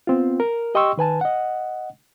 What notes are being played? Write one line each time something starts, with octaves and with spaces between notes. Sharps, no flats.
B3 C4 F4
A#4
G4 D#5 G5 C6 C#6 E6
D#3 B4 G#5 A5
D#5 F#5